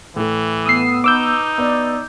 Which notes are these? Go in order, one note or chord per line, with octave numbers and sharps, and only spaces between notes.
A2 E3 A3
B3 D#6 E6 C7
D#4 B4 D6 E6 G6
B3 D5